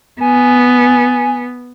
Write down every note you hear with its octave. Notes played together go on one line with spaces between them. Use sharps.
B3 G#5